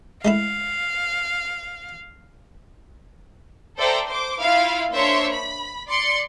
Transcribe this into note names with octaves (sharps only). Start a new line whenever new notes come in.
G#3 A3 E4 F5
A4 C5 D5 E5 G5 A#5
C5 D6
E4 F4 F5
A#3 D4 C5 C#5 E5 C6
B5
D5 C6 C#7